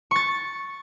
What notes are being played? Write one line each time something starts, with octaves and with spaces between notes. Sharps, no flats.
C#6 A6